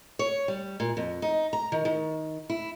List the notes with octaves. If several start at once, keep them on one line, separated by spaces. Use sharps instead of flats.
C#5
G3
A#2
F2
D#4
A#5
D#3
D#3
E4